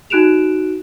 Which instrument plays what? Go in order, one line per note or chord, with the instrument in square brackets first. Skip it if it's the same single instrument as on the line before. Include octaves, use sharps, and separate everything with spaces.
[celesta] D#4 F#4 F#6 D7 E7 F7